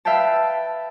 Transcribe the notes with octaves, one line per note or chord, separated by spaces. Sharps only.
B4 E5 F5 G5 A5